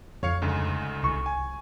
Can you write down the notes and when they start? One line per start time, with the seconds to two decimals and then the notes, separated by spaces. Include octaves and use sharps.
0.23 F2 C#5 F5 C#7
0.42 D2 G#2 C#3
1.03 C2 C#6
1.26 G#5